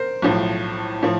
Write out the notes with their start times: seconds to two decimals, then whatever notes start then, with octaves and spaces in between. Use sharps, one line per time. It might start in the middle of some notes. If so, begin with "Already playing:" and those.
Already playing: A#4 C5
0.22 B1 A2 F3
1.03 A2 F3